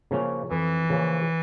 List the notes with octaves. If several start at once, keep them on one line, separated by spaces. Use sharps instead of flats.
C#3 F3 A#3 C#4
F2 E3
C#3 F3 A#3 C#4